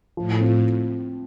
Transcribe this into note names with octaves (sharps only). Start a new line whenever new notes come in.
A2 F3
C4 F4